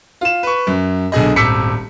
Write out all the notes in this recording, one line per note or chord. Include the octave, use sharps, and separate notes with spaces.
F4 E7
B4 C#6
F#2
B1 D3 G#4 D#5
D#1 G#1 D6 E6 B6 C#7